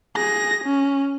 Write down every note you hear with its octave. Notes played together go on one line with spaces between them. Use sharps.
G#4 A#6
C#4